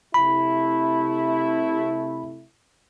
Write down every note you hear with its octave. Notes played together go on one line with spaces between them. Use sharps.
C3 A3 E4 B5